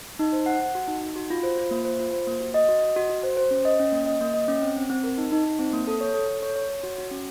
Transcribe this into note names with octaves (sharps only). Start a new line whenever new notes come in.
D#4
C5
F#5
F#5
F#4
D#4
D#4
F#4
F4
C5
F4
A#3
C5
F4
C5
A#3
F#4
D#5
F#4
D#5
F#4
F#4
C5
C5
C#4
D#5
C#4
A#3
D#5
A#3
D#5
C#4
C4
C4
C4
A#4
D#4
D#4
D#4
C4
A#3
A4
C#5
A4
A4
C#5
C#5
C#5
F#4
F#4
C#4